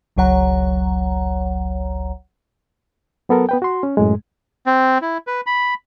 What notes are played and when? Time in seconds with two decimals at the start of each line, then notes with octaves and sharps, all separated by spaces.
0.16 G1 C#2 F#3 C#5 F#5 A#5
3.29 F#3 B3 A4 A#4
3.49 B3 B4 G5
3.62 F#4 C6
3.83 C#4
3.97 F#2 A2 G#3
4.66 C4
5.02 E4
5.27 B4
5.46 B5